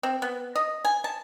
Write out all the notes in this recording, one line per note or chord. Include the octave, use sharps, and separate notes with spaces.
C4
B3
D#5
G#5
A5